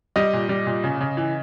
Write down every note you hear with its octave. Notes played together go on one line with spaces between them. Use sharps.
G3 D#5
A#2
G3
A#2
C#3
C#3
E3